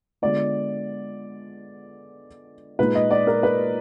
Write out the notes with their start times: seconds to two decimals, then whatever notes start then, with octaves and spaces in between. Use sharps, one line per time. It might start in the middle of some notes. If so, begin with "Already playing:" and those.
0.22 D3 G#3 B3 D4 F4 D5
2.79 A#2 G#3 D#4 B4
2.95 D#5
3.11 D5
3.27 A#4
3.43 B4